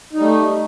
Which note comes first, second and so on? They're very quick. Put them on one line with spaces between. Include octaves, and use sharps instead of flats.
D#4 G3 A3